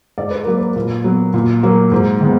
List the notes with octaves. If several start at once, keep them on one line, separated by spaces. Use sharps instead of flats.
G#2 D5
B4
F#3 A#3 A#4
B4
A#2
F#3 B3
A#2
F#3 A#3
G#2
D#3 G#3 B3